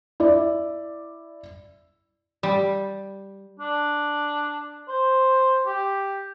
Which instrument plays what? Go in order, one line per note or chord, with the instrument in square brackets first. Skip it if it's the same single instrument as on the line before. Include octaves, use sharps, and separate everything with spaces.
[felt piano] E4 D5
[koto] G3
[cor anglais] D4
C5
G4